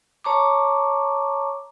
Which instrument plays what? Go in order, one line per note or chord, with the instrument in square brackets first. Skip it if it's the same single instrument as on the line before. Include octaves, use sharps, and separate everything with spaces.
[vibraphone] C#5 A5 A#5 C#6 D6